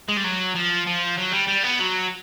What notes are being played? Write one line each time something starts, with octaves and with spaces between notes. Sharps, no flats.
G#3
G3
F#3
F3
F3
F#3
G3
G3
B3
F#3